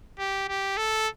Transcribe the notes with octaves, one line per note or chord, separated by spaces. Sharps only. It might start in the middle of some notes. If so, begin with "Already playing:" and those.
G4
G4
A4